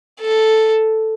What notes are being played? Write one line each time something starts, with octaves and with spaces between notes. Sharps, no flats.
A4